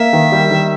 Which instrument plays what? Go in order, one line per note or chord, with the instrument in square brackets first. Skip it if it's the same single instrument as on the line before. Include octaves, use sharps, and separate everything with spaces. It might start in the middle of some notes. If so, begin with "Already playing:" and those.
Already playing: [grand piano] A#3 [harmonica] E5
[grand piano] D#3
G3
D#3